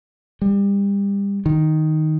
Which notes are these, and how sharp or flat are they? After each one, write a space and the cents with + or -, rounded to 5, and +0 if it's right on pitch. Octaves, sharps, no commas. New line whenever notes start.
G3 +30
D#3 +0